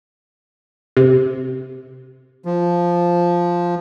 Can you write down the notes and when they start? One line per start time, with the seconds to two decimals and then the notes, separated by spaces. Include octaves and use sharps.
0.97 C3
2.45 F3